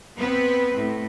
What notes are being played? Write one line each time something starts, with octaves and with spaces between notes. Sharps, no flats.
B3 C4 B4
A2